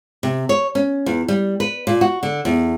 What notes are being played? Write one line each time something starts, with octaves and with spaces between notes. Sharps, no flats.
C3
C#5
C#4
E2
G3
B4
A#2
F#4
D3
E2